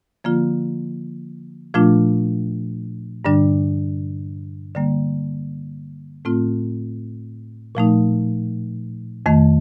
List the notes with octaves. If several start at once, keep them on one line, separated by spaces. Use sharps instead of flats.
D3 F3 A#3 F4
A#2 F3 A3 D4 F4
G2 D3 G3 D4
D3 G3 A#3
A2 A3 C4 F4
A#2 F3 A3 D#4
F2 D#3 A3